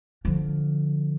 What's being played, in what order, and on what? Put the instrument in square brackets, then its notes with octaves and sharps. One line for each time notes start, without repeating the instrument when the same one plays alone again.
[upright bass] D3 F3